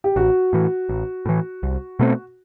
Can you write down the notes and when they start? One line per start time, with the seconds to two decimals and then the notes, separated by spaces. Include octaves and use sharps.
0.04 G4
0.16 A1 F#4
0.53 A2 E3
0.89 A1
1.26 A2 E3
1.63 C2
1.99 B2 A3 C4